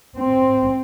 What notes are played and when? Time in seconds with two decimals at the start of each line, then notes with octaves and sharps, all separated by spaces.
0.16 C4